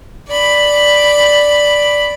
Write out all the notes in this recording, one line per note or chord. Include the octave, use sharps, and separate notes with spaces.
D5 B5